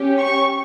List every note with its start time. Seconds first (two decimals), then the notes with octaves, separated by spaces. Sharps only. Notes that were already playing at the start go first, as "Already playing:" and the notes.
Already playing: C#4 G4
0.18 C#6